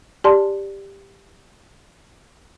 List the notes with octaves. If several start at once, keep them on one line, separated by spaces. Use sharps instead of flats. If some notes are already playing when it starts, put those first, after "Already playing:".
G4 D5 G#5 A5 C6